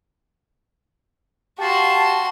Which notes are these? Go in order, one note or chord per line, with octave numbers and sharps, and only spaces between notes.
F#4 G4 F5 A5 C6